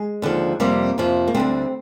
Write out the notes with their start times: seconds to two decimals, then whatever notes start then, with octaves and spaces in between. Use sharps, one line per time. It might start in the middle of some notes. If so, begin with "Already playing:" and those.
Already playing: G#3
0.22 D#2 D3 F3
0.60 F2 C3 G3 A#3
0.98 F2 C3 F3
1.28 A#3
1.35 D2 D3 G3 C4